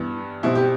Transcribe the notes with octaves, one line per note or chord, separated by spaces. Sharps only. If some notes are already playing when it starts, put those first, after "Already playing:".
Already playing: G2 E3 B3
B2 G3 C4 E4
G4